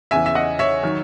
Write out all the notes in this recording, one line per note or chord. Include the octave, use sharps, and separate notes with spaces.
E2 C#3 E3 E5 G#5
E5
D#5 F#5
C#5 E5
D#3 F#3